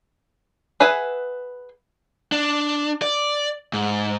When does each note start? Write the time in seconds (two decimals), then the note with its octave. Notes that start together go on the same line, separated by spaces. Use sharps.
0.80 G#4 B4 E5 F#5 G#5
2.32 D4
3.02 D5
3.73 G#2